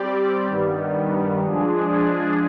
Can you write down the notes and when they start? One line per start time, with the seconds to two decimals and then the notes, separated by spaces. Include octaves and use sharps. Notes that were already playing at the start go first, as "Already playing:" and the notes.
Already playing: G3 C4 G4 D5
0.46 G2 D#3 G3 B3
1.41 F3 G#3 D4 G#4